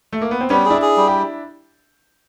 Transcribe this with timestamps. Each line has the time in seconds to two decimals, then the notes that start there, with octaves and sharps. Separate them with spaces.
0.13 A3
0.22 A#3
0.31 B3
0.41 C4
0.50 G3 B3 C#4
0.66 D4 E4 G#4
0.82 G#4
0.97 G3
1.08 G4